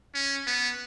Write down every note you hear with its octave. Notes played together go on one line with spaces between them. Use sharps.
C#4
B3